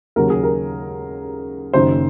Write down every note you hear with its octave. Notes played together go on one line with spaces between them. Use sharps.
D#2 C#3 F#3 A#4
G#4
A#4
F#1 F#2 D#3 C5